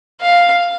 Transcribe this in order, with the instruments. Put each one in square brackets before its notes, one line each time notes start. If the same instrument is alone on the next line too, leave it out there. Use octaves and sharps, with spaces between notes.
[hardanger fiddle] F5